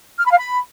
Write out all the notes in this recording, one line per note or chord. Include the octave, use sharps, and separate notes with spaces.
F6
B5
F5
B5